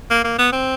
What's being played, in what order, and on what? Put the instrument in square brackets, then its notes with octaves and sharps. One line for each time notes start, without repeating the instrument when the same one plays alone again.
[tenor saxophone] A#3
A#3
B3
C4